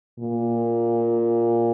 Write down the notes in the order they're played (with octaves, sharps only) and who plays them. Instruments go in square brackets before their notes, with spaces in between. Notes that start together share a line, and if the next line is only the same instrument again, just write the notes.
[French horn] A#2